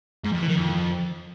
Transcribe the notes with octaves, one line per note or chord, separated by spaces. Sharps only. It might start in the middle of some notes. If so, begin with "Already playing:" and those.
G#2
F2
E3
D#3
F2